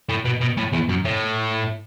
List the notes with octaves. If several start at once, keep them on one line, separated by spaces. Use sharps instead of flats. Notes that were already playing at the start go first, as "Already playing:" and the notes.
A2
B2
B2
A2
E2
F#2
A2